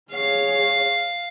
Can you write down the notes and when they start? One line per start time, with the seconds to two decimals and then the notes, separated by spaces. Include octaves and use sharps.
0.12 G#4 C#5 F5